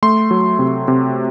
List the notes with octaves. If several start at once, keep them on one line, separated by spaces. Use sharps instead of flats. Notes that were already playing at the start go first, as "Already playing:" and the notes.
A3 C6
F#3
C3
C3